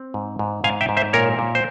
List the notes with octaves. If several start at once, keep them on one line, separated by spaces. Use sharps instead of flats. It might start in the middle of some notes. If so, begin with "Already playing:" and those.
Already playing: C4
G#2
G#2
G#2 F5 G#5
E5 G5
G#2
C5 E5
A#2 A#4 C#5
A#2
C5